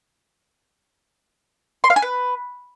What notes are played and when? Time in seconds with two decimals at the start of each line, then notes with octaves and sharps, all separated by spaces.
1.84 C6
1.90 F5
1.96 G#5
2.02 B4